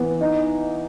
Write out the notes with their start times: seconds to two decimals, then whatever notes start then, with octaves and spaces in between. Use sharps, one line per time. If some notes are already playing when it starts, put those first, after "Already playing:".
Already playing: E3 B3
0.21 D#4